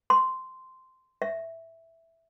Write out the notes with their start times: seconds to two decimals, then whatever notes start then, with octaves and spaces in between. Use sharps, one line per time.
0.10 C6
1.22 E5